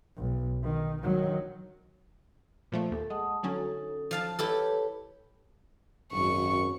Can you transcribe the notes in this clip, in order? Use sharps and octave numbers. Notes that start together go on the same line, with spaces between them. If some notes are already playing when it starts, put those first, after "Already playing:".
B1
D#3
D#3 F#3
A#2 F3 A3
D#2 A4 E5
G#3 F#5 A5 D#6
D3 F#3 C#4 D#4 A4
F3 F5 A5
E4 G4 A4 B4 C#5
G#1 F#2 C#6